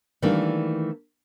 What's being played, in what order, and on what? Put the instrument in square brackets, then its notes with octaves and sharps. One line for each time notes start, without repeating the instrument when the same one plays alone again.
[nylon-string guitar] D#3 E3 G3 A3 A#3 D4